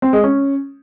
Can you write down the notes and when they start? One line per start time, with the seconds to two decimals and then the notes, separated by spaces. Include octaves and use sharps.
0.02 C4
0.13 G#3
0.24 C#4